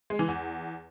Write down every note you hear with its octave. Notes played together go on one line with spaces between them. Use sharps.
G#3
E3
E2